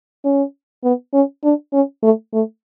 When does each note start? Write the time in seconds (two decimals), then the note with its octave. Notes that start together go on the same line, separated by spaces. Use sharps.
0.25 C#4
0.84 B3
1.14 C#4
1.44 D4
1.73 C#4
2.03 A3
2.33 A3